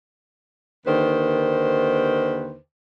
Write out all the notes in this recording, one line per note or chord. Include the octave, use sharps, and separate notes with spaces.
D#2 D3 D#3 B4 C5